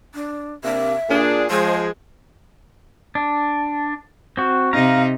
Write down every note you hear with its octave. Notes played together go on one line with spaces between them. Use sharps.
D4
C3 A#3 D4 E5
A#2 D4 G#4
F3 G#3 C5
D4
C4 F#4
C3 D#4 F5 A#5